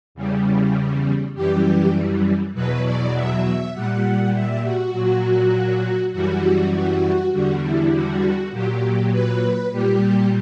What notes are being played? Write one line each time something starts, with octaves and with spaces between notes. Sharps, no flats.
E2 C#3 G3
F#2 E3 G3 G4
E2 B2 F#3 B4
D5
E5
A#2 G3 F#5
E5
F#4
A#2 F#3
F#2 E3 G3 F#4
F#4
E2 D3 G3 F#4
E4
F#4
A#2 F#3 G4
B4
A#2 G3 G4